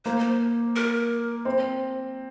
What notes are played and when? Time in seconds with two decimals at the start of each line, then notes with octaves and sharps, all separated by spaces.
0.05 A#3 C5
0.20 C5
0.76 A#4
1.45 C4